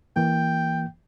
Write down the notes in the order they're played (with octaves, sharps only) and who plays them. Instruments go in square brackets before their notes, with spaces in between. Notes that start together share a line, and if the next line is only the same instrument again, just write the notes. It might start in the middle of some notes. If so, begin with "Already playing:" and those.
[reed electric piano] E3 A#3 [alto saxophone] G5